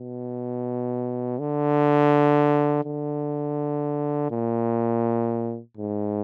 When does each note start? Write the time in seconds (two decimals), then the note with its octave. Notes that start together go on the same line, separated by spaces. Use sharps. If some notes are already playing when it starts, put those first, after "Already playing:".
Already playing: B2
1.39 D3
2.84 D3
4.31 A#2
5.77 G#2